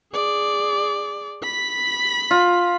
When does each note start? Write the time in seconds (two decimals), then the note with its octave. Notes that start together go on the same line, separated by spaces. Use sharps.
0.13 G#4 D5
1.43 B5 B6
2.31 F4